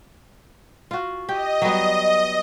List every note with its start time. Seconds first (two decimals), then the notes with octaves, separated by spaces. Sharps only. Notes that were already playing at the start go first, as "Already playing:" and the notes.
0.91 F4 F#4
1.29 G4 D#5
1.62 F#3 G3 B3